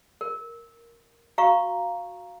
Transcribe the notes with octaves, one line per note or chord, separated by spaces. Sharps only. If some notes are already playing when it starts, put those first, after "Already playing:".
A#4
F#4 F5 A#5 C#6